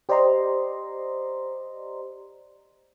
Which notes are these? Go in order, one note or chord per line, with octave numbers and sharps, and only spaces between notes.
G4 C5 D5 D#5 A#5 C6